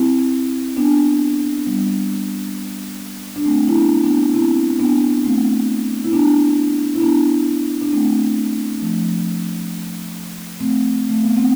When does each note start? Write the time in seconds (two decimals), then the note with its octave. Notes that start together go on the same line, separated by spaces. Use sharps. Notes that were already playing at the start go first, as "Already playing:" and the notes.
Already playing: C4 E4
0.77 B3 D4
1.66 G3 B3
3.36 D4
3.45 A3 C4
3.68 E4
3.75 B3 D4
4.04 B3 D4
4.34 C4 E4
4.79 B3 D4
5.24 A3 C4
6.04 E4
6.13 B3 D4
6.95 E4
7.02 B3 D4
7.82 D4
7.92 A3 C4
8.81 F3 A3
10.60 A3 C4
11.09 A3
11.23 B3
11.37 C4